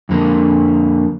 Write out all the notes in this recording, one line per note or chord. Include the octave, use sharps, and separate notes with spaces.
F2 D3 A#3